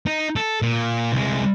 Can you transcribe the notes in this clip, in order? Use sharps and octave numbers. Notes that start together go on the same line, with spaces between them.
D#4
A4
A#2
C2 G#3